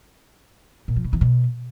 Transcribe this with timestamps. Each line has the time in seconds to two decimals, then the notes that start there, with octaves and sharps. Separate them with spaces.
0.88 A#2
0.96 F3
1.05 B2
1.13 E3
1.21 B2